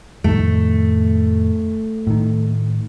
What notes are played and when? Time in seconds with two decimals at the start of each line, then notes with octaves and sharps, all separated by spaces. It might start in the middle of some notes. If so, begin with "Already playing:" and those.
0.24 F2 A2 D#3 A3
2.07 A2 D#3